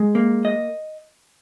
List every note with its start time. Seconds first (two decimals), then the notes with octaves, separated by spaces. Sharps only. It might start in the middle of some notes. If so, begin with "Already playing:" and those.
Already playing: G#3
0.15 A#3
0.45 D#5